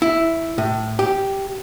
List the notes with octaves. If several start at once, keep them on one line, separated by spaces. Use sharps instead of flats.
E4
A2
G4